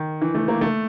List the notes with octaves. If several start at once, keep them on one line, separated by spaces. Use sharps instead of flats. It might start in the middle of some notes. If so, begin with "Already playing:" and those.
Already playing: D#3
E3
A3
A#3
A3